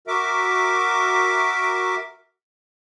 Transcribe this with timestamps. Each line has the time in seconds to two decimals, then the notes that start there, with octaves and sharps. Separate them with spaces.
0.07 F#4 A#4 E5 D6